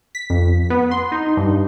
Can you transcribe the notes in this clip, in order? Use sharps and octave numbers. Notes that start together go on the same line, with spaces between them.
B6
F2
B3
C6
D#4
G2